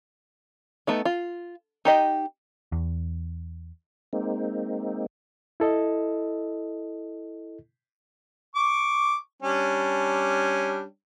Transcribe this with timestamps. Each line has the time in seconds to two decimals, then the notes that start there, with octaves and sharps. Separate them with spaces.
0.87 A3 B3 D#4
1.05 F4
1.85 D#4 G4 D#5
2.72 E2
4.13 G#3 A#3 C4 D#4
5.60 E4 A4 D#5
8.56 C#6 D6
9.42 G3 C#4 D4